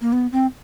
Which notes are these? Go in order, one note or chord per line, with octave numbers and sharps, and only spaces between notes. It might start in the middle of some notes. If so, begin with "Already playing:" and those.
A#3
B3
C4